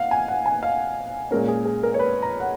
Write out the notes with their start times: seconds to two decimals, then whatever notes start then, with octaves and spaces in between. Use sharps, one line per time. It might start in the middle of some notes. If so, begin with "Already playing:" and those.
Already playing: F5 F#5
0.11 G#5
0.28 F#5
0.46 G#5
0.63 F5
1.31 A#2 G#3 C#4 A#4
1.48 G#4
1.65 G#4
1.83 A#4
1.94 C#5
1.99 B4
2.22 A#5
2.40 F#5